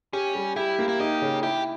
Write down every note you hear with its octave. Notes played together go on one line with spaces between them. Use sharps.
C#4 G4
G3
E4 G4
A#3
E4
D#4 G4
C#3
E4 G4